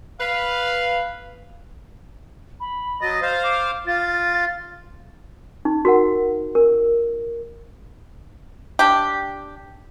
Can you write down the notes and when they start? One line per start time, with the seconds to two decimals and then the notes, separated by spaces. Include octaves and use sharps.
0.20 B4 F5
2.60 B5
3.01 F#3 D#5 A6
3.22 C5 F5
3.43 D6
3.87 F4 A6
5.65 D#4
5.85 F#4 A#4 F#5
6.55 A#4
8.79 D4 G4